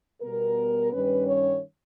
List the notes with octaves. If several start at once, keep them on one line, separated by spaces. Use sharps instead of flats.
B2 G3 B3 A#4
G2 D#3 G3 C#4 B4
C#5